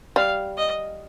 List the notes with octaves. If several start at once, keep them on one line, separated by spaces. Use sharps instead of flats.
G3 F5
D#5